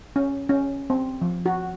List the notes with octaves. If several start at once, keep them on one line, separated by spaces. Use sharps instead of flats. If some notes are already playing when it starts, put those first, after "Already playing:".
C#4
C#4
C4
F3
F#4